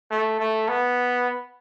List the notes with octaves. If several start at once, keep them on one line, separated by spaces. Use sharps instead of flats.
A3
A3
B3